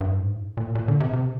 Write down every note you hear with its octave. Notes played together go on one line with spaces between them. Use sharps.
G2
G#2
A#2
A#2
D3
C3
C3